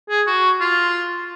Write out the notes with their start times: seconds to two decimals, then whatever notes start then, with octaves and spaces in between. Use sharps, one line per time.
0.09 G#4
0.27 F#4
0.61 F4